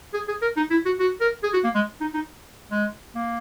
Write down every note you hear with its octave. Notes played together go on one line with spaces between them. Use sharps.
G#4
G#4
A#4
D#4
E4
F#4
F#4
A#4
G#4
F#4
A#3
G#3
D#4
D#4
G#3
A#3